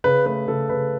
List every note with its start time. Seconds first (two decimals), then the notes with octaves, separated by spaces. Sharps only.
0.04 C#3 B4
0.26 A3 B4
0.47 C#3 A4
0.69 C#3 B4